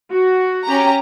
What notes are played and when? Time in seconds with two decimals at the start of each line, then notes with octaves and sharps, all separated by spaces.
0.11 F#4
0.65 C#4 G4 A#5